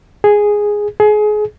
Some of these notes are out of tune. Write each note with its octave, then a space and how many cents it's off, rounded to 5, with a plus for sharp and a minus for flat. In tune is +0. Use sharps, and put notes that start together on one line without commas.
G#4 -5
G#4 +25